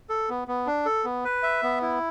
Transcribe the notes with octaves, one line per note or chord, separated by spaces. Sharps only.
A4
B3
B3
D4
A4
B3
B4
E5
B3
E4